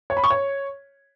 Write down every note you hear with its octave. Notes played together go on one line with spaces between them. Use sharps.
C#5
B5
C#6
C#5